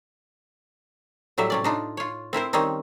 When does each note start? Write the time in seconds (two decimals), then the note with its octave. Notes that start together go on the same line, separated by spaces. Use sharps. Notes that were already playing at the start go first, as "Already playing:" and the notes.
1.38 A2 F#3 G3 E5
1.50 C3 C#4 D5
1.64 D4 D#4 F4
1.97 F4 C#5
2.33 C4 E4 A#4 C5
2.53 D#3 G3 C4 C#4 D#4